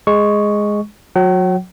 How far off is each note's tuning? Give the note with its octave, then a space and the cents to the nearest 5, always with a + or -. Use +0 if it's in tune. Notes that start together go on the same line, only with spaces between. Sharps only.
G#3 +0 C#6 +0
F#3 -25 F#5 +45